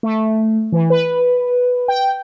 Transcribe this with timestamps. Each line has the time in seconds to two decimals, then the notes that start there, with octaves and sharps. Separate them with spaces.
0.03 A3
0.72 E3
0.90 B4
1.88 G5